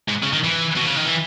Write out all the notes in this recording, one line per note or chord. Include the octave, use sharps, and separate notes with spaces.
G#2
C#3
D#3
E3
B2
C#3
D#3
E3